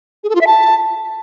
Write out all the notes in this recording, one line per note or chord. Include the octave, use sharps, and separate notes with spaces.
G#4
A4
F4
E5
A5